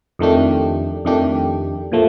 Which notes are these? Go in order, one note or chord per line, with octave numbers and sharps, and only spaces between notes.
F2 D#3 A3 D4 G4
F2 D#3 A3 D4 G4
A#2 F3 A3